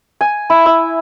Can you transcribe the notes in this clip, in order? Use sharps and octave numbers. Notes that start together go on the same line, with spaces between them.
G#5
E4
E5